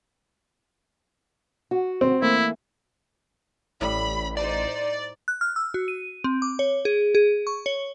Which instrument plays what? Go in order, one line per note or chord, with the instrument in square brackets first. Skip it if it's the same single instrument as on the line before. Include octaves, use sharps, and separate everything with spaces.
[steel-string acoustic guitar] F#4
[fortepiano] C4
[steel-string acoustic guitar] E3 A3 A#3 [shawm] E4
[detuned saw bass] A1 [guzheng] A2 G3 [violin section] B5
[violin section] D#4 C5 [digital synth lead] D5
[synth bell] F#6
F6
E6
F#4
D#7
C4
D6
C#5
G#4
G#4
C#6
C#5